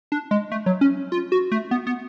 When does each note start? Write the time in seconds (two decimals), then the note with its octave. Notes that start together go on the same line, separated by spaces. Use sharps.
0.12 D4
0.31 G#3
0.52 A3
0.66 F#3
0.81 C#4
1.12 F4
1.32 F#4
1.52 A3
1.71 B3
1.87 B3